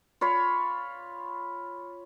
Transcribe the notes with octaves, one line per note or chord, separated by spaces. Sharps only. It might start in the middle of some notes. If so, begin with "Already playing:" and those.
F4 C#5 B5